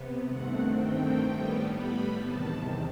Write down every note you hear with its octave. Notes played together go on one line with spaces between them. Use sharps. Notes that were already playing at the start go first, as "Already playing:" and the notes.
Already playing: C3 B3
G2 D#3 A3 C4 F#5
G5
A2 G3 B3
B5
E2 C3 D#3 A5